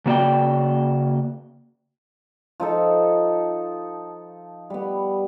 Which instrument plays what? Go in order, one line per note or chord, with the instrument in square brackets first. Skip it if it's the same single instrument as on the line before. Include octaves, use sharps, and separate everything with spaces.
[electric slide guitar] C#3 A#3 F#4 D5 G5
[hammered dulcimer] F3 D#4 A4
G3 B3